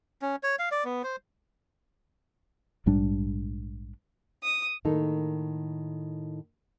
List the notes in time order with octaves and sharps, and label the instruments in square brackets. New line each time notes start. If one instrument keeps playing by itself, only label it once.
[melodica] C#4
C#5
F5
D5
B3
C5
[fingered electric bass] A#1 G#2 G3 D4
[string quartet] D#6
[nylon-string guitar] A2 D#3 A#3 D#4 A4